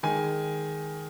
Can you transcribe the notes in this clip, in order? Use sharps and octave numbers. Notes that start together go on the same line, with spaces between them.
D#3 G#3 G#5